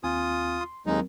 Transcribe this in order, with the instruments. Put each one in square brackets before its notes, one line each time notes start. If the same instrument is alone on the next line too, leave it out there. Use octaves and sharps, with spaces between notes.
[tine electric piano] D#2 C4 G#5 [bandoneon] F4 D#6
[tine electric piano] C6
[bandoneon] D#2 G#3 D#4 [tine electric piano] F#3 C4 A#4